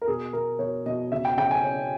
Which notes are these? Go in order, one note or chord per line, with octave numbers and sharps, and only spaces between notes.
A#4
B2 G#4
B2 A#4
B2 C#5
B2 D#5
C#3 E5
G5
C#3 G5
G#5
C#4